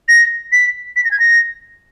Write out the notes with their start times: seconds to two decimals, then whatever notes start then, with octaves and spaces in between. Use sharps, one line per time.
0.08 A#6
0.52 B6
0.96 B6
1.05 A#6
1.11 G#6
1.20 A#6